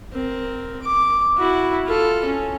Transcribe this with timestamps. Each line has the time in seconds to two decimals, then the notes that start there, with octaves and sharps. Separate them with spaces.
0.13 C4 A#4
0.82 D6
1.38 E4 F#4
1.88 F4 A4
2.25 C#4